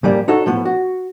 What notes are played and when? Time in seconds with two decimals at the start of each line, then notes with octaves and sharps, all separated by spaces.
0.03 G#2 F3 G3 A#3
0.28 D#4 F#4 A4 C#5
0.46 A2 F3 B3
0.65 F#4